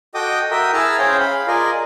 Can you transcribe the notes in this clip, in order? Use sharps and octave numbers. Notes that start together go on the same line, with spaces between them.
F#4 A4 D#5 G5 D6 D#6
F#4 A#4 E5 G5 D#6
E4 G#4 A5 A#5 E6 F6
C#4 G#4 C5 C#5 F5 G5
F5 B5
F4 G#4 A#4 D5 D#5